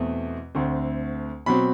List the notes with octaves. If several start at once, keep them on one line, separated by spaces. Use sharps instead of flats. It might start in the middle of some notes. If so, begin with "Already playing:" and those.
Already playing: E2 B2 A3 C4
D2 D3 A3 C4
B2 F#3 C4 B5